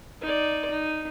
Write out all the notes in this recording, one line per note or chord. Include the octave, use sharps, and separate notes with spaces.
D#4 D5
D#4